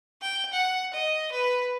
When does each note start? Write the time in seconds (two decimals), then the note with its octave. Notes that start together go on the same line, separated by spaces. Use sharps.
0.22 G5
0.53 F#5
0.93 D#5
1.32 B4